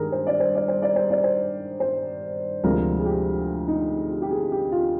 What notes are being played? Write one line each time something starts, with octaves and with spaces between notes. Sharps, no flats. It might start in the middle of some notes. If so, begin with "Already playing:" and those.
Already playing: G2 D#3 G#3 G#4 A#4
C5
D5
C5
D5
C5
D5
C5
D5
C5
C5
D2 C3 F3 G#3 A#4
G#4
G4
D#4
G4
G4
G#4
G4
F4